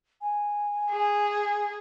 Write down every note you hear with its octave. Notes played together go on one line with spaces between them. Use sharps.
G#5
G#4